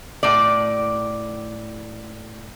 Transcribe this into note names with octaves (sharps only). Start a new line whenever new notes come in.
A2 D5